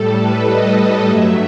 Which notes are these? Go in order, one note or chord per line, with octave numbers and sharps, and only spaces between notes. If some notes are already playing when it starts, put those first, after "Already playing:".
Already playing: A2 G3 A4
B4
D#5
G2 F#3 A3 E5